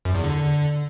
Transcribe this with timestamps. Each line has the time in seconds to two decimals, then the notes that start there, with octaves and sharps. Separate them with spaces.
0.05 F#2
0.15 E2
0.24 D3